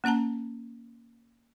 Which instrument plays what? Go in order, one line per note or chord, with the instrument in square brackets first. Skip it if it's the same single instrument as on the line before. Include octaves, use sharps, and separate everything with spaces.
[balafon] A#3 C#4 F#5 A5 A#5